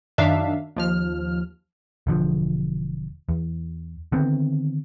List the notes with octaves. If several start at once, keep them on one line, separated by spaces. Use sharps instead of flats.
F#2 D#3 D4 E5 F5
D#2 F3 F6
E1 D3 F3
E2
D3 D#3 B3 C4